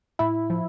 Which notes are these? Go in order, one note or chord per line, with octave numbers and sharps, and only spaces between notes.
A2 E4
F3